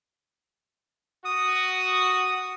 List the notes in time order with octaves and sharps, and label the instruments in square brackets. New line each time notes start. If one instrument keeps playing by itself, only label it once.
[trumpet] F#4 [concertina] D#6